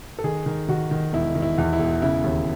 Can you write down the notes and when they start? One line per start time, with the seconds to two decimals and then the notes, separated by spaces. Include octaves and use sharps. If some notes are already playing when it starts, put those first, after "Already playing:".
0.19 A4
0.24 D#3 G#4
0.46 D#3
0.68 D#3 F#4
0.91 D#3
1.13 E1 E4
1.35 D#3
1.42 E4
1.58 E2
1.73 E4
1.80 E1
2.02 C#3 E4
2.24 D#2